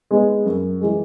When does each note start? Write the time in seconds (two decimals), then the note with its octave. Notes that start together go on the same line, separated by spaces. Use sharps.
0.11 G#3 B3 D#4
0.45 F#2
0.81 E3 G#3